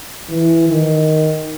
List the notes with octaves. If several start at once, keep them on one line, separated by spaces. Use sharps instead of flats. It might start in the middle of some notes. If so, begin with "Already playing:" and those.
E3
D#3